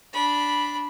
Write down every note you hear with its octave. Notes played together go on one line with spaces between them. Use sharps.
D4 B5